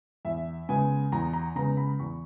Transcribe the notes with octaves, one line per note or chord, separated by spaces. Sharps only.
E2 E5
C#3 G#3 B3 G#5
E2 A#5
A#5
C#3 G#3 B3 A#5
B5
E2 C#6